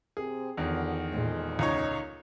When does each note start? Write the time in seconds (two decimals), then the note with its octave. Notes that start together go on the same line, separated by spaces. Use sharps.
0.17 C3 C4 G#4
0.57 E2 D3 D#3 F3
1.12 F2 A#2 G#3
1.59 C#2 D#4 C#5